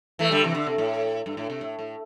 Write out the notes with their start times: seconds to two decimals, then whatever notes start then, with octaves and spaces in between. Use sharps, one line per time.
0.19 E3 A3
0.31 D3 G3
0.44 C3 E3
0.55 D3
0.67 C3
0.78 A2
1.26 G2
1.37 A2
1.50 C3
1.61 A2
1.79 A2